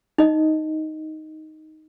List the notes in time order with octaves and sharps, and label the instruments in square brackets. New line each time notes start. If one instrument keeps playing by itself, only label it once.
[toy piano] D#4 D#5